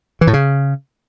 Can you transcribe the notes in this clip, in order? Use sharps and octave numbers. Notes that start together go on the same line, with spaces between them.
E3
A2
C#3